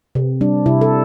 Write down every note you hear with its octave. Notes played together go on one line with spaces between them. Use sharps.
C3
G3 D4
C3 E4
A4